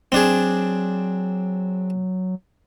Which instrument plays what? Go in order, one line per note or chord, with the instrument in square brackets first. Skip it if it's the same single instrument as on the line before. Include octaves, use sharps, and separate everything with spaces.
[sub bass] F#3 [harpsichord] C4 D4 G#4